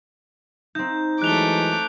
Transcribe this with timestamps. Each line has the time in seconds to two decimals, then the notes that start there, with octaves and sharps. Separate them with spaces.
0.75 C4 D#4 G6
1.22 E3 F#3 G#3 A3 D6 F#6 F7 G7